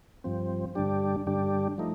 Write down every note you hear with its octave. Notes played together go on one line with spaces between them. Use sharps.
G2 F3 C4
G2 D3 G3 D4 G4
G2 D3 G3 D4 G4
F3 A3 D#4